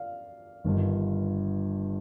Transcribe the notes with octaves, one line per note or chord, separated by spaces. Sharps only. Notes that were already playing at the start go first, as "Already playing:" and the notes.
Already playing: D5 F5
G1 G2 D#3